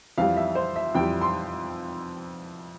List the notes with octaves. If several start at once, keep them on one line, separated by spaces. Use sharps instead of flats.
F2 E3 G3 F5
E5
C5
E5
F2 E3 G3 G5
C6